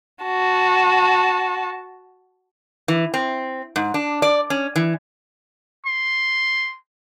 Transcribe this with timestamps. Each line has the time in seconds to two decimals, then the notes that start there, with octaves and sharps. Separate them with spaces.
0.24 F#4 A5
2.88 E3
3.14 C4
3.76 G#2
3.94 D4
4.22 D5
4.50 C#4
4.76 E3
5.86 C6